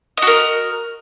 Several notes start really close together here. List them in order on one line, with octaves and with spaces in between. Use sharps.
D#5 F#4 A#4